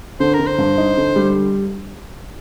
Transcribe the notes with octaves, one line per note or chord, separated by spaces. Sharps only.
D3 C5
A#4
D3
C5
G2
D#4
D3
G3